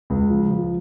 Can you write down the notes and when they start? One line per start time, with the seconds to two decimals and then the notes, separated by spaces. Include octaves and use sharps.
0.10 C#2
0.30 F3
0.50 F3